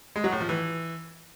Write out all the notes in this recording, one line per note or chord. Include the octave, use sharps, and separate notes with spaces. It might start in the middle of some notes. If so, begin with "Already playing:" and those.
G#3
F#3
A2
F3
E3